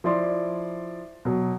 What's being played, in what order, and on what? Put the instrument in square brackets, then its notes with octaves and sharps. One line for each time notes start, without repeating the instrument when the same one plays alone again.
[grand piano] F3 E4 D5 C6
B2 F#3